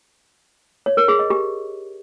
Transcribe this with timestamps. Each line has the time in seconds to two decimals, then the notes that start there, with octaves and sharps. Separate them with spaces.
0.86 C#5
0.97 A#4
1.08 G#4
1.19 D#5
1.30 G4